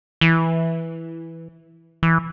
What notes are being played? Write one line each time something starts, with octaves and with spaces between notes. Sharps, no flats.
E3
E3